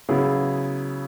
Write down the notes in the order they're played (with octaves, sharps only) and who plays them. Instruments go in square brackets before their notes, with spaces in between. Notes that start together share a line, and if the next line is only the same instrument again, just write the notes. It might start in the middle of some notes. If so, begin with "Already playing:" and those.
[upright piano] C#3 F#3 B3 E4 G#4